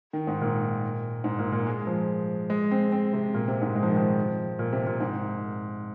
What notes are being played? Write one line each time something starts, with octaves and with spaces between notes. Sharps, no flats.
D#3
G#2
A#2
G#2
A#2
A#2
G#3
F3
G#3
C4
C4
C3
A#2
C3
G#2
G#3
F3
D#3
F3
A#2
C3
A#2
G#2